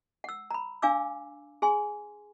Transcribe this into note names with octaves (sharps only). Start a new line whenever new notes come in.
F#5 E6
A#5 B5
D4 F5 G#5 D6 E6
G#4 G#5 C6